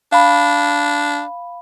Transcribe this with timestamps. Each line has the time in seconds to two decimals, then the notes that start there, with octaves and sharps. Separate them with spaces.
0.12 D4 F5 B5